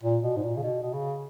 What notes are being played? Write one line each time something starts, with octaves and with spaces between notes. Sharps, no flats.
A#2
B2
G#2
A#2
C#3
B2
B2
C#3